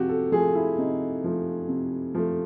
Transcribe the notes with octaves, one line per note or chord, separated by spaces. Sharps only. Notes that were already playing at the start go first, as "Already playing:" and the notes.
Already playing: C3 F3 F#4 G4
A4
F3 A3 G#4
E4
C3 D#4
F3 A3
C3
F3 A3